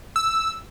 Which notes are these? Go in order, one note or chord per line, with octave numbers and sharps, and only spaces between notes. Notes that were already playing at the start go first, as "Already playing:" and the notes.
E6